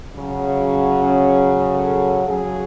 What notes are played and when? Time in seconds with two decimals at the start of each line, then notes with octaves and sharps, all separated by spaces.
0.16 C#3 F#3
0.68 C#4
1.73 A4
2.27 C#3 F#3 G#4